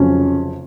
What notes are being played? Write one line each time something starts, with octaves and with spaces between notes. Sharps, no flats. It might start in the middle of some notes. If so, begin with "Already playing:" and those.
Already playing: F1 F2 C#3 F#3 C#4